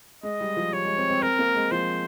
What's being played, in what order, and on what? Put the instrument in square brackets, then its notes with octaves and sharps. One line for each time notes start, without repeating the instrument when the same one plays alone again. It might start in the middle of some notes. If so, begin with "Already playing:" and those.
[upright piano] G#3 [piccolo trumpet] D#5
[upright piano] G3
F3
[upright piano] G3 [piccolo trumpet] C#5
[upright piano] G#3
C4
C4
[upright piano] C4 [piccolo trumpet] A#4
[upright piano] A#3
G#3
[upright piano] F3 [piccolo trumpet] C5